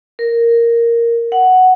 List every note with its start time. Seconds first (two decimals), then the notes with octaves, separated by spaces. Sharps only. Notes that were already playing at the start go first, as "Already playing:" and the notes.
0.19 A#4
1.32 F#5